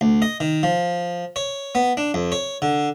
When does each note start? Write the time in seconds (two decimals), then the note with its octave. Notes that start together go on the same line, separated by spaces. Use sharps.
0.01 D2
0.22 D#5
0.40 D#3
0.63 F3
1.36 C#5
1.75 B3
1.97 D4
2.14 F2
2.32 C#5
2.62 D3